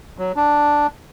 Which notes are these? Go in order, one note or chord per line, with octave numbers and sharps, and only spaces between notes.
F#3
D4